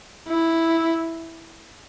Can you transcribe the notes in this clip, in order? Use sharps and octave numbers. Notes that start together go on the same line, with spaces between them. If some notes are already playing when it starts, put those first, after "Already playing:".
E4